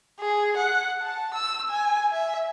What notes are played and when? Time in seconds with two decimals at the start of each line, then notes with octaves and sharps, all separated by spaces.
0.20 G#4
0.57 F#5
1.01 A5
1.34 E6
1.70 G#5
2.12 E5